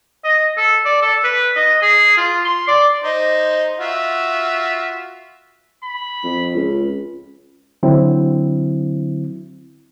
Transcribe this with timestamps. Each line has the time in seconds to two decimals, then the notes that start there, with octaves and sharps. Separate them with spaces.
0.24 D#5
0.57 A4
0.85 D5
1.02 A4
1.24 B4
1.56 D#5
1.82 G#4
2.17 F4
2.45 C6
2.68 D5
3.04 D#4 C5 D#5
3.79 F4 F#4 E5
5.84 B5
6.24 F2
6.55 C#2
7.83 D3 F#3 C4 E4